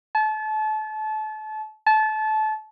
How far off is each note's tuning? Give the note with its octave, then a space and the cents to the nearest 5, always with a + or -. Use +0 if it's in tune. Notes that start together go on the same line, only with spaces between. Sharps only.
A5 -30
A5 -25